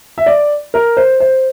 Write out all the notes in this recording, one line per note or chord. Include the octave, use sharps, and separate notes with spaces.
E5
D5
A#4
C5
C5